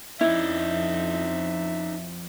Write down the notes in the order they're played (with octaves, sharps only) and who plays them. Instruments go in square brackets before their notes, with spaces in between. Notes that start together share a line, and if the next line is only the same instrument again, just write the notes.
[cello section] F2 [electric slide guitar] C#4 D#4 [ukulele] E4 [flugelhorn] E5